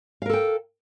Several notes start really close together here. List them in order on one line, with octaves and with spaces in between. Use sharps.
F5 A#4 A4 G5